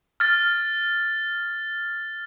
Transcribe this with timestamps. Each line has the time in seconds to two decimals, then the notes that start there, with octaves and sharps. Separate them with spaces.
0.20 F6 A6